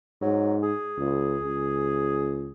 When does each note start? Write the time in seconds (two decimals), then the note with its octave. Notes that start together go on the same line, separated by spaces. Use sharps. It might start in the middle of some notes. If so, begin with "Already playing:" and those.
0.22 G#2 F#3
0.63 G#4
0.98 C#2
1.43 C#2